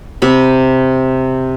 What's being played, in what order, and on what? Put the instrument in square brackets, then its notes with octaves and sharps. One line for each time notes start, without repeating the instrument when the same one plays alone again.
[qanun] C3 B5